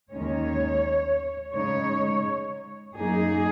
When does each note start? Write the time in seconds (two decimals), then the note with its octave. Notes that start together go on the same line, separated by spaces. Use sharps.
0.12 D#2 D#3 G#3 C#4 C#5
1.53 C#3 G#3 D#4 C#5
2.96 F#2 F#3 A#3 D#4 G#4